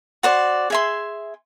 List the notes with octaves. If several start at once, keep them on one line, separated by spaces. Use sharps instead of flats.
F#4 C5 D5
G#4 E5 C6